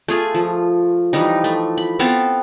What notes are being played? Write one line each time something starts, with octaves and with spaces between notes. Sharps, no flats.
A3 F4 G#4 G#5
F3
E3 F3 G3 D#4
A3
B5
B3 C4 A4 F5